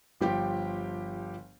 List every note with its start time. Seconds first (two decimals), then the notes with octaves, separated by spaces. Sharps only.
0.21 G1 F3 G4 G5